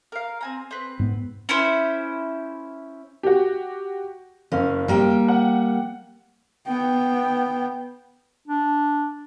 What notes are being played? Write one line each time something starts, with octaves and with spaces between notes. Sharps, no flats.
A#4 F5
C4 G#5 A#5
C4 B4
G#2 B3
C#4 E4 C5
F#4 G4
F#1 C#4 F5
G3 A#3 G5
F#5
B3 G5
D4